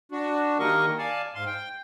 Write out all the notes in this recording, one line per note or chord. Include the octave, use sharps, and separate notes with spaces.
D4 F#4
D#3 G3 A#3 A#4 D#5 C#6
D5 F5 G#5 A5
G#2 F5 C6
G5